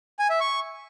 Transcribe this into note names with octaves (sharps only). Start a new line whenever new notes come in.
G#5
E5
C#6